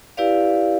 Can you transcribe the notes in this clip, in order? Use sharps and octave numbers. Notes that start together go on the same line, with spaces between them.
E4 G4 B4 D5 F5